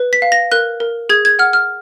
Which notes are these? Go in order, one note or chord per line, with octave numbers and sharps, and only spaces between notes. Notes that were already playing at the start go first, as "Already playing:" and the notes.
Already playing: B4
B6
F5
A#6
A#4 F#6
A#4
G#4 G#6
G#6
F#5 F6
F6